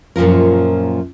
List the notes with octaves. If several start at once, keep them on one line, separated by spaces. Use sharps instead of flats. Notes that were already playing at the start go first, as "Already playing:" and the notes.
F#2 A#2 F3 F4 A#4